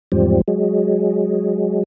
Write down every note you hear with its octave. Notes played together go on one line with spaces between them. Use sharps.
E2 G#2 F3 G3 C4
F#3 G#3